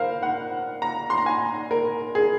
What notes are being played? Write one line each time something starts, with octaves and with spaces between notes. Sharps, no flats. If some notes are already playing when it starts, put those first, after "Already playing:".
Already playing: A#4 C5 F5
F#5
A#5
C6
A#5
G#5
A#4
G#4